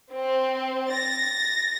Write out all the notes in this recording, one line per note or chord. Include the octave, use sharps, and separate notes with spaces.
C4
A6 A#6